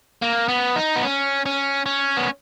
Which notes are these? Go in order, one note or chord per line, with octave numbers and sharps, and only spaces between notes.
A#3
B3
D#4
B3
C#4
C#4
C#4
B3